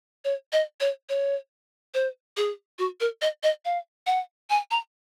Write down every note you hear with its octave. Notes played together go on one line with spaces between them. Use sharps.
C#5
D#5
C#5
C#5
C5
G#4
F#4
A#4
D#5
D#5
F5
F#5
G#5
A#5